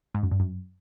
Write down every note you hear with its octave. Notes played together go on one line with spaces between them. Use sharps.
G#2
F#2
G2
F#2